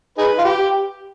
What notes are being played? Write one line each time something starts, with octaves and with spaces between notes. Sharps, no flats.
D#4 G#4 B4
F4
G4